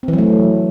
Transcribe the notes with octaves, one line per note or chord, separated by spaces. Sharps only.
C4
E3
F#3
A3